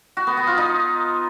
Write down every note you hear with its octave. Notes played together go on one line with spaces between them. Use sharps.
F#4
B3
B3
F4
D#4